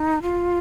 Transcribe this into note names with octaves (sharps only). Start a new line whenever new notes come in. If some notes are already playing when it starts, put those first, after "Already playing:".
Already playing: D#4
F4